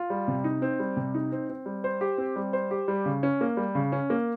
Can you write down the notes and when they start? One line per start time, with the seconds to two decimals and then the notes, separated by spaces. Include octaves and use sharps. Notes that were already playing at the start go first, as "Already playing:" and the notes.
Already playing: F4
0.10 G3
0.28 C3
0.44 D#4
0.62 C4
0.79 G3
0.97 C3
1.14 D#4
1.32 C4
1.50 C4
1.66 G3
1.84 C5
2.01 G4
2.18 C4
2.36 G3
2.53 C5
2.71 G4
2.88 G3
3.06 C#3
3.23 C#4
3.41 A#3
3.57 G3
3.75 C#3
3.92 C#4
4.10 A#3